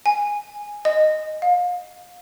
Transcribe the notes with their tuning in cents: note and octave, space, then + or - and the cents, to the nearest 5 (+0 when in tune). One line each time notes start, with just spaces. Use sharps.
G#5 -5
D#5 -5
F5 +35